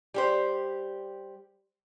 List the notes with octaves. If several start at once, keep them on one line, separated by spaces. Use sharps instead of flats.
G3 G4 C5